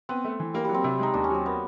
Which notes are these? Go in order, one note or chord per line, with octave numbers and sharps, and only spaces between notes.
B3 C4
A3
E3
G3 A#3
F#3 G3
C4
C3
G#3 D#4
D#2 D4
C#4
F#3 C4
A#3 B3